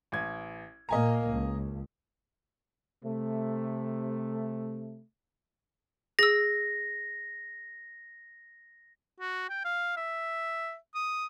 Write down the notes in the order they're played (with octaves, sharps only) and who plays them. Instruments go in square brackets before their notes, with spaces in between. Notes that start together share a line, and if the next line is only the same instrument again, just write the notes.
[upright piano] A1 G#6
[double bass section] A#2 A#3 [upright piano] D#5 G#5 A#5
[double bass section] C#2
[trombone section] C3 A3
[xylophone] G#4 E6 [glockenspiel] A#6
[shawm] F#4
G5
F5
E5
D#6